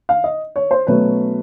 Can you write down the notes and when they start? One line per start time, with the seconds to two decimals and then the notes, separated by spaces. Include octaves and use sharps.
0.09 F5
0.24 D#5
0.56 C#5
0.71 C5
0.87 B2 F#3 A3 C#4 B4